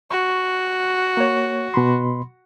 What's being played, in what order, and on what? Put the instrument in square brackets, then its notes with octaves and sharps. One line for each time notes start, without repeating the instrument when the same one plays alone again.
[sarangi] F#4 [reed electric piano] C#6
[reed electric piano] A#3 C#5
B2 B5 C6